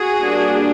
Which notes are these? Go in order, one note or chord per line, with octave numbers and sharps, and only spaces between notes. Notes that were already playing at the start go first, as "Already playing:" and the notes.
Already playing: F#4 G#4
G3 A#3 D4